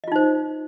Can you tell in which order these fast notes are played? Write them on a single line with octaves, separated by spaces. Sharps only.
D#5 F4 D#4 C5